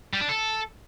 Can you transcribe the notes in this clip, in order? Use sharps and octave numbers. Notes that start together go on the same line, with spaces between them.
G3
D4
A4